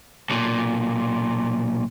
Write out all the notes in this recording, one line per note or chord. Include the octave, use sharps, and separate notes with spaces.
B1 A#2